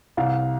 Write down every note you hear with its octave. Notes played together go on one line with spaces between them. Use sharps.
C2 F5